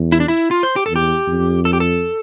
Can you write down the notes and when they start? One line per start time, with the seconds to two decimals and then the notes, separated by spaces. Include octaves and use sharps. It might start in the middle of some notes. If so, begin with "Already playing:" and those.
Already playing: E2
0.12 E4
0.20 D4
0.28 E4
0.51 F4
0.63 C5
0.76 G4
0.86 E2 A4
0.96 G4
1.27 F2
1.65 A4
1.73 G4
1.80 A4